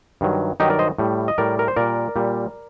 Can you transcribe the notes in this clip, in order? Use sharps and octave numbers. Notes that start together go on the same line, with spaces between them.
G2 D#3 F#3
G2 D#3 F#3 D#4 G4
A#4 D5
C5 D#5
A2 G3
D#5
A2 G3 A#4 D5
A#4
C5
A#2 G3 A#4 D5
A#2 G3